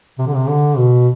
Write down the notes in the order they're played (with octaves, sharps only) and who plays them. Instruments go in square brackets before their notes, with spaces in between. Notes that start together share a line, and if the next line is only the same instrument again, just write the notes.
[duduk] C3
D3
C3
D3
B2